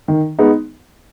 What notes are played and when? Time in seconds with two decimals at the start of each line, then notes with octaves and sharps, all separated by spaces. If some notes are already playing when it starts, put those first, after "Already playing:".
0.08 D#3
0.39 G#3 B3 D#4